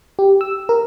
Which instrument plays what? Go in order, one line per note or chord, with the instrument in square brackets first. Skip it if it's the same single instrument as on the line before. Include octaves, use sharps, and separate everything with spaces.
[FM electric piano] G4
E6
A#4